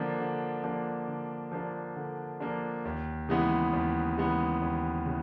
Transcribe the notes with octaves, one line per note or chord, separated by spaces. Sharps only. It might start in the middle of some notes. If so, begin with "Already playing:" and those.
Already playing: D3 F3 A#3 D4
D3
F3 A#3 D4
D3
F3 A#3 D4
D3
F3 A#3 D4
D#2
C#3 E3 G#3 B3
D#2
C#3 E3 G#3 B3
D#2
C#3 E3